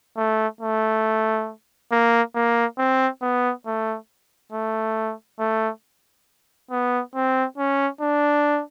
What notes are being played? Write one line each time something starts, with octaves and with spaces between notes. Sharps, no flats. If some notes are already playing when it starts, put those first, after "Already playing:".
A3
A3
A#3
A#3
C4
B3
A3
A3
A3
B3
C4
C#4
D4